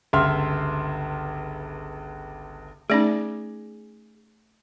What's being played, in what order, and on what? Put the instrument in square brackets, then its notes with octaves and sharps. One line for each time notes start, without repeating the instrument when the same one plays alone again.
[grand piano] G1 C#2 E5 C6 F6
[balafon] A3 C#4 D#4 [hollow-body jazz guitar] G#4 D5